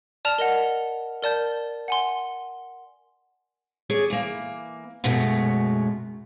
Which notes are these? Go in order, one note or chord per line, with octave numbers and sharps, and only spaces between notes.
D5 A5 F6 F7
A#4 D#5 F#5
A#4 D5 A5 G6
F#5 G#5 C6
G#4 C#5 D5
E3 A#3
F#2 B2 F#3 G#3 A3